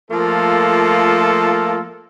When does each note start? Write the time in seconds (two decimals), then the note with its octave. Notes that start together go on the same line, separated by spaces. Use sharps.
0.11 F3 A3 A#3 F4 A4